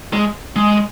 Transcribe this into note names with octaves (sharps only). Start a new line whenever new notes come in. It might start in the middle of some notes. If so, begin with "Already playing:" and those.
G#3
G#3